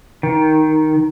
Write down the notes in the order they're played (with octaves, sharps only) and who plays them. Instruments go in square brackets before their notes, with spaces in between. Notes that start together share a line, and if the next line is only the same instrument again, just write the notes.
[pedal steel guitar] D#3